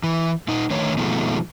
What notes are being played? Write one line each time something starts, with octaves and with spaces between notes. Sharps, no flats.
E3
A#2 D#4
D3 D#3 A3 C#5
B2 D#3 F3 G#3 A3